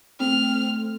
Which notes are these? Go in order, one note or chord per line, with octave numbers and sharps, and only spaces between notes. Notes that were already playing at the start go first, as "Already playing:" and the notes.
A3 C4 F6